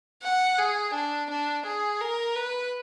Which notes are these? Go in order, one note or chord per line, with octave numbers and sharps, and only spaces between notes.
F#5
G#4
D4
D4
G#4
A#4
B4